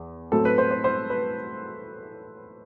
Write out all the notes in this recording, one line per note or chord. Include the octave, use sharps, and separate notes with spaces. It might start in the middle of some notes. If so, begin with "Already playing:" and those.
Already playing: E2
A2 F#3 C4 A4
B4
C5
C5
C5
B4